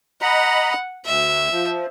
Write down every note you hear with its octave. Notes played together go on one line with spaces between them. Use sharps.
D#5 F#5 A#5 B5
D2 E5
F3